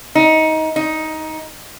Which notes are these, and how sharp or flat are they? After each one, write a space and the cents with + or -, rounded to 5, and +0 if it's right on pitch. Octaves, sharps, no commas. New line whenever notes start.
D#4 +20
D#4 +15